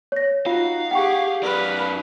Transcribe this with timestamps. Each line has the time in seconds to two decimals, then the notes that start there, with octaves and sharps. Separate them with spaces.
0.12 C#5 A#6
0.46 D#4 F4 F#4 F5
0.91 G4 G#4 F#5 G5 C#6
1.43 F#2 B4 D5 F5